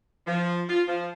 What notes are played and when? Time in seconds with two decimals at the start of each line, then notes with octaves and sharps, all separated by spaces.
0.27 F3
0.69 F4
0.88 F3